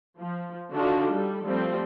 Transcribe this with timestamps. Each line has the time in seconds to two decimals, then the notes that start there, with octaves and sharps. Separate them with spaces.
0.19 F3
0.73 D3 D4 D#4 F4 F#4
1.12 G3 A4
1.44 F3 G3 A3 C4